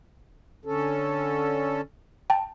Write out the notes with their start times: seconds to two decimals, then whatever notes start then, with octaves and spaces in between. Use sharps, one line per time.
0.65 D3 C#4 A4
2.30 G5 A5